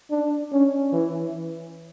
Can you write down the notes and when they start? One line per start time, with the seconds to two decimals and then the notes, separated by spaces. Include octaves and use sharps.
0.11 D4
0.52 C#4
0.93 E3